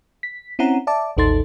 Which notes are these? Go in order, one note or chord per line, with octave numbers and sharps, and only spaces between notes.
B6
C4 C#4 E4 F#5 A#5
D5 E5 A5 D6
A1 D#2 D#4 A4 C6 A6